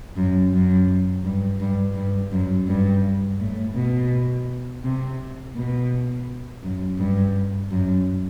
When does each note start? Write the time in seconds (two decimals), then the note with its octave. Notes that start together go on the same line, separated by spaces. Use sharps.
0.16 F#2
0.52 F#2
1.24 G2
1.60 G2
1.96 G2
2.31 F#2
2.67 G2
3.40 A2
3.75 B2
4.83 C3
5.55 B2
6.63 F#2
6.98 G2
7.70 F#2